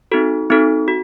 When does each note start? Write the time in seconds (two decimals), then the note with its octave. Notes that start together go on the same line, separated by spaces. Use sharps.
0.11 C4 D#4 F#4 A4
0.50 C4 D#4 F#4 A4
0.88 F#4